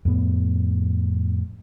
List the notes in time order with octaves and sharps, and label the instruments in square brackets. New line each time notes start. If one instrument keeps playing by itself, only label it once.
[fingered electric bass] F2 A2 B3